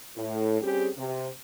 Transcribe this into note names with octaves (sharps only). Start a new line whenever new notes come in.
A2
G3 C4 C#4 G4 G#4
C3